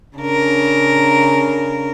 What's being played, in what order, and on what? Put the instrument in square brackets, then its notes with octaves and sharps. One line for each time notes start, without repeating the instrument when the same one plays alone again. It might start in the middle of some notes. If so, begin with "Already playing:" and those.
[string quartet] C#3 D4 A#4